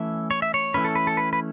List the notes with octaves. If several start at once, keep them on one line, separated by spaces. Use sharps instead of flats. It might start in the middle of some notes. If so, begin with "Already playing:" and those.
Already playing: E3 A3 C#4 E5
C#5
E5
C#5
E3 A3 C#4 B4
A4
B4
A4
B4
B4